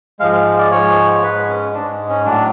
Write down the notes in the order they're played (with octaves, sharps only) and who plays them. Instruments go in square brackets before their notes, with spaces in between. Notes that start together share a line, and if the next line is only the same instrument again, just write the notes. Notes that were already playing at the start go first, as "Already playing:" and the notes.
[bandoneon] G#2 F3 G#3 F5
F5
D5
G#2 F3 G#3 C#5
C#5
G#2 G#3 B4
C#4
G#2 G#3 D4
C#4
A2 F#3 D4